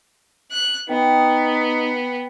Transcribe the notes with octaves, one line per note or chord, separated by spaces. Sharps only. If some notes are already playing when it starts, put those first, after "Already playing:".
F#6
B3 D#4 G5